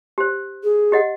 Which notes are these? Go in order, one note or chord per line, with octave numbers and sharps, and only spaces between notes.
G4 C5
G#4
G4 D#5 F#5